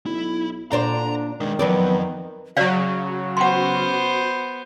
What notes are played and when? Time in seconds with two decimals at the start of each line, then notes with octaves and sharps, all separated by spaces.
0.06 B1 E4
0.72 A#2 D3 D4 C5 A#5
1.40 D#3 G#3 D4
1.59 F3 F#3 B3 C4 D5
2.57 C#3 F#3 F#4 C#5 D5 F5
3.37 B3 C5 F#5 C6